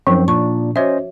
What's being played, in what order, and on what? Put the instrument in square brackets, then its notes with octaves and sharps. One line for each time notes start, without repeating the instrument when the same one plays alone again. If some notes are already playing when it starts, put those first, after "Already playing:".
[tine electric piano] F#2 C4 [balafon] F3 D#4
[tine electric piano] A#2 D4 [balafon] C#6
[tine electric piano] C#4 C5 D#5 [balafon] F#4 C#5 E5